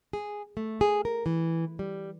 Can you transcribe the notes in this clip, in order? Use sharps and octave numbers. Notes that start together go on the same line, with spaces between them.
G#4
A3
G#4
A#4
E3
G3